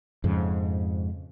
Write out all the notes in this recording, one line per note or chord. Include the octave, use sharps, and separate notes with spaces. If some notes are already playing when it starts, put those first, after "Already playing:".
F2 G#2 C#3